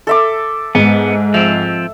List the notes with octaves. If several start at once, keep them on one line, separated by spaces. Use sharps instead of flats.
A4 E5 D6
G#2 B3
F3 C4 E5